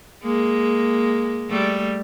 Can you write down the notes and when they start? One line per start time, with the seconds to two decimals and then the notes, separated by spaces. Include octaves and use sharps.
0.23 G#3 A#3
1.49 G3 A3